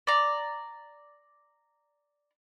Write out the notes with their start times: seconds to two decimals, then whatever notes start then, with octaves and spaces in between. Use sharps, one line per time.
0.07 D5 A#5